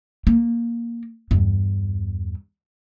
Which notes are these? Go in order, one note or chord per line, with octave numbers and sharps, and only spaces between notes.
A#3
E2 G2